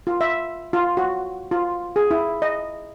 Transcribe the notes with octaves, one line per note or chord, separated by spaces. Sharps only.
F4
E5
F4
F#4
F4
G#4
E4
D#5